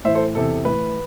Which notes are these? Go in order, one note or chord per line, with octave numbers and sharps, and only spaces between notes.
A2 E3 C5 E5
A4 C5
E2 C3 E3 A4
A2 E3 B4